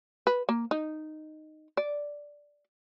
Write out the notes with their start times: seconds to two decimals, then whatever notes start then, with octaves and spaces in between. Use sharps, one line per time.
0.27 B4
0.49 A#3
0.71 D#4
1.77 D5